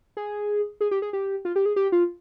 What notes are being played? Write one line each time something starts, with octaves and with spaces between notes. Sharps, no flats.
G#4
G#4
G4
G#4
G4
F4
G4
G#4
G4
F4